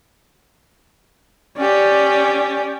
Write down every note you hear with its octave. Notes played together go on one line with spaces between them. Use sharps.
C#4 G4 D5